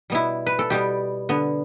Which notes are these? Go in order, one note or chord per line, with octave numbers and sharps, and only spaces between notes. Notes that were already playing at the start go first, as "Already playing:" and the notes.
B2 G3 B3 E4
B4
A4
B2 G3 B3 G4
D3 B3